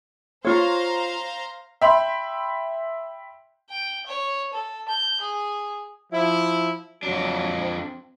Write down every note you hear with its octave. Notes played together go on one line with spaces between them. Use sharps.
F4 C5 C#5 F5 A#5
E5 G5 B5 C6
G5
C#5
A4
G6
G#4
F3 E4
F2 F#3 D4
C4 C5